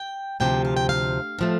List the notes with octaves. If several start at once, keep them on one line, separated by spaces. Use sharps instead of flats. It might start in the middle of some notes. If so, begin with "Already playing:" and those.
Already playing: G5
D2 C3 F3 G5
F5
G5
F5
A2 F3 A3